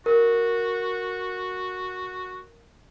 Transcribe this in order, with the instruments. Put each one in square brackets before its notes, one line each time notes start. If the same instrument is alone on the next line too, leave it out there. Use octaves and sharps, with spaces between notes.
[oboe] F#4 [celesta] A#4